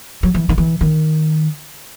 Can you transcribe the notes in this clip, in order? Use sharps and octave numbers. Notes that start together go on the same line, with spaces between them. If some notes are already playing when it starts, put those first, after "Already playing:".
F#3
E3
D#3
E3
D#3